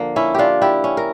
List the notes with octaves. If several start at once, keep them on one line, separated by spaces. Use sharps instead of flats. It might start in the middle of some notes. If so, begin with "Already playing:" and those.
Already playing: D3 F3 A#3
C#4 E4
D4 F4 G4
E4 G4
C#4
A#4